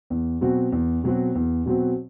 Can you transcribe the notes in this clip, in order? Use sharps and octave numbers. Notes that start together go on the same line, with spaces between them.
E2
B2 F#3 C4 F#4
E2
B2 F#3 C4 F#4
E2
B2 F#3 C4 F#4